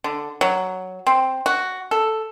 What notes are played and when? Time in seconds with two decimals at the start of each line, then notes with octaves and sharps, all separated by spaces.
0.04 D3
0.41 F#3
1.07 C4
1.46 F#4
1.91 A4